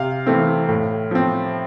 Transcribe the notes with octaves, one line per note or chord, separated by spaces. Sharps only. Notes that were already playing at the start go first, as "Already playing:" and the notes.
Already playing: C3 F5
E3 A3 C4
A2
F3 C4